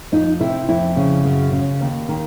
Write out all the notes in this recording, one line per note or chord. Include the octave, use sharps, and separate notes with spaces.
F2 D#4
C3 E4
F2 E4
C#3
F#2
C#3
D#2
D#3